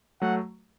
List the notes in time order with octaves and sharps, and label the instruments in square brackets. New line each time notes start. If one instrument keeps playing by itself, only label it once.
[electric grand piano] F#3 A3 [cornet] F#5